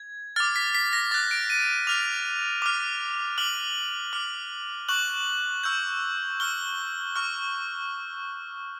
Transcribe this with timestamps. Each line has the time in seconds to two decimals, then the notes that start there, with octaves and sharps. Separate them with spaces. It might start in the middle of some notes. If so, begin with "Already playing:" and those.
Already playing: G#6
0.36 D6 F6 A6
0.56 B6
0.75 B6
0.93 A#6
1.11 D6 F#6 A6
1.31 D7
1.50 D#7
1.87 D6 F6 F7
2.62 D6 F6
3.38 D6 F6 F#7
4.13 D6 F6
4.89 C#6 F#6 F#7
5.64 C#6 E6 G6
6.40 C#6 F6 G7
7.16 C#6 F6